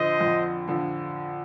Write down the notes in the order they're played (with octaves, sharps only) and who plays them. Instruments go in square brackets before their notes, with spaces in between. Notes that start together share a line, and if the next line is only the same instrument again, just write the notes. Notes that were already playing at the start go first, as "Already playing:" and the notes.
Already playing: [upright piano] F2 D3 F3 [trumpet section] C5 D#5
[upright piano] F2
D3 F3